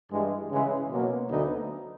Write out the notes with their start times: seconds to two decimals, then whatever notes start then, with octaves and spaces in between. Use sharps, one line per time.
0.11 G2 E3 G#3
0.51 C#3 E3 G#3
0.90 B2 F#3 A#3 C#4
1.29 D2 D3 F#3 B3 D#4